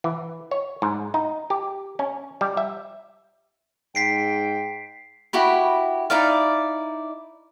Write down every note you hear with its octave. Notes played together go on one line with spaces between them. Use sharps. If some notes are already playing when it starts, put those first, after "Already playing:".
E3
C#5
G#2
D#4
G4
C#4
G3
E5
G#2 G5 B6 C7 D7
E4 F#4 G4 B5
D#4 E4 D5 F5